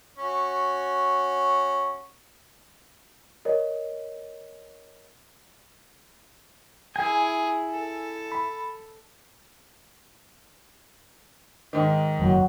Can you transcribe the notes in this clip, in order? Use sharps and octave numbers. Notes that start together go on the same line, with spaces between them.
C#4 F#4
A#4 C#5 D#5
E4 G#4 G#5
A4
B5
G#2 D#3
F#1 F#3